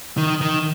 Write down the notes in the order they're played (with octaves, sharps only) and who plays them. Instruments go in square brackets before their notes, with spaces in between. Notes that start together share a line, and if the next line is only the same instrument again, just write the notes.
[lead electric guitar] D#3
D#3